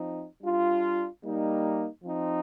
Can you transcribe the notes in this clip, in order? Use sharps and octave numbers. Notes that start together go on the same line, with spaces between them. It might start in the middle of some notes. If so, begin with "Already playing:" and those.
Already playing: F3 C4 D#4
G3 D4 F4
G3 A#3 D#4
F3 C4 D#4